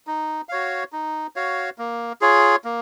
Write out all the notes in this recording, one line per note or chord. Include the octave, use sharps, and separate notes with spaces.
D#4
F#4 C#5 F5
D#4
F#4 C#5 F5
A#3
F4 G#4 C#5
A#3